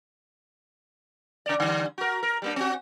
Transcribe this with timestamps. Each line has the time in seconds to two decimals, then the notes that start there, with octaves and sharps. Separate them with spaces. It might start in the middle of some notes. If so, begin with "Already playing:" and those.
1.46 C#3 D5
1.60 D3 G3
1.98 F#4 A#4
2.23 A#4
2.42 G3 A#3 D4
2.56 C4 F#4